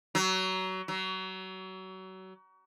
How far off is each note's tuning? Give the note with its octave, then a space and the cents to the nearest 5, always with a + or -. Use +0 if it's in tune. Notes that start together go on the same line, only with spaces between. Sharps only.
F#3 +25
F#3 +30